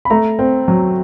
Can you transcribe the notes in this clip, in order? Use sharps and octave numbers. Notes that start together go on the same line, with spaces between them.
B5
A3 A#5
C4
F#3